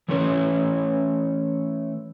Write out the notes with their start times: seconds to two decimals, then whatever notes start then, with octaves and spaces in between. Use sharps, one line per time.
0.08 E3 A3 C#4 B4 C#5